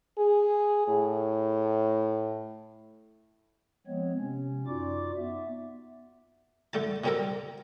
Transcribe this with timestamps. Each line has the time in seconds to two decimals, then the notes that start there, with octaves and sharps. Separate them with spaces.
0.18 G#4
0.88 A2
3.87 F3 G#3 B3 C4 C#5
4.19 C3 C#4
4.67 F#2 D#4 F4 F#4 D5 D6
5.17 B3 E5
6.73 D3 A3 A5
7.04 B2 D3 G3 C4 A4 A#4